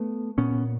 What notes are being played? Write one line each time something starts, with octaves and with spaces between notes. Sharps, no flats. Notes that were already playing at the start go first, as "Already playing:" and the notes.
Already playing: A3 B3
A#2 B3 C#4